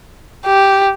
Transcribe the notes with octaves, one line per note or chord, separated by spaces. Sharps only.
G4